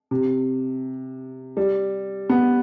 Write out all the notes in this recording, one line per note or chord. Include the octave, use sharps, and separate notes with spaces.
C3
G3
B3